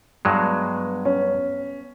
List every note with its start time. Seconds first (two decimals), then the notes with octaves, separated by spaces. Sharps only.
0.25 G2 F#3 G#3 B3
1.05 C#4